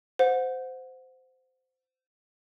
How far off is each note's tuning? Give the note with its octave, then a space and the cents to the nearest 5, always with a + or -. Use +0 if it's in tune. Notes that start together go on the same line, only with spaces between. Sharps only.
C5 -20 F#5 -25